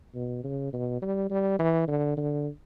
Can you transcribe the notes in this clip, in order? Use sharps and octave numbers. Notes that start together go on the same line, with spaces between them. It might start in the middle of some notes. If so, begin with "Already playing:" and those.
B2
C#3
B2
G3
G3
E3
D3
D3